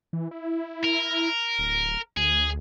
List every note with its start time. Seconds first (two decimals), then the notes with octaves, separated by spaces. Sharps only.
0.13 E3
0.31 E4
0.84 A#4
1.59 D1
2.17 D2 G#4